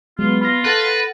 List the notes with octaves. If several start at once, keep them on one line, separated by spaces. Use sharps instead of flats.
F#3 G#3 B3 F4
F4 B5 A#6
A4 B4 F#5 A6 A#6